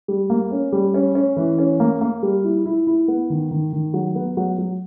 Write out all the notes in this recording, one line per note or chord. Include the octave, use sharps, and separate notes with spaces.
G3
A#3
C#4
G3
C#4
C#4
E3
C#4
A#3
A#3
G3
E4
E4
E4
B3
D#3
D#3
D#3
F#3
B3
F#3
F#3